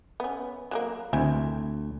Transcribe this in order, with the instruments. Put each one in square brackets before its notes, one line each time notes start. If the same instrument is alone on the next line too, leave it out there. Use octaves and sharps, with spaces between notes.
[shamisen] B3 C#4
F#3 G#3 A#3
[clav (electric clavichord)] D2 [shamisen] C4 E4 G#5